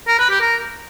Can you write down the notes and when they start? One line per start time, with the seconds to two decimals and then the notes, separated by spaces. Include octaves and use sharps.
0.08 A#4
0.19 B4
0.30 G4
0.41 A#4